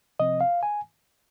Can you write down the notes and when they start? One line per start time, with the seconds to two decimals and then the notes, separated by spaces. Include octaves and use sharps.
0.20 C3 F3 C4 D#5
0.41 F5
0.63 G#5